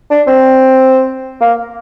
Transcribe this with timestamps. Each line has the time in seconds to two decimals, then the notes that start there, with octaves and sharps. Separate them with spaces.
0.11 D4
0.27 C4
1.41 A#3